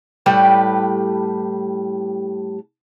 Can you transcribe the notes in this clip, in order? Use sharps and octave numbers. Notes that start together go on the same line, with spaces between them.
A2 G3 G4 B4